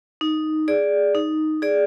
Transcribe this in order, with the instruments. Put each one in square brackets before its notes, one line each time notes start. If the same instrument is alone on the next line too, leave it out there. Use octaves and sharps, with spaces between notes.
[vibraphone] D#4
G#4 D5
D#4
G#4 D5